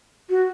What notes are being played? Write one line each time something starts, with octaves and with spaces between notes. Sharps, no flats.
F#4